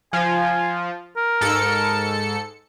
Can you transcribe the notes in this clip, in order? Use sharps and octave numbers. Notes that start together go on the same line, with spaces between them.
F3 F4 G#5
A#4
G#2 A4 C#7